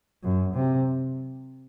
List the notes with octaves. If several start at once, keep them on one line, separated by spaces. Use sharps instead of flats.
F#2
C3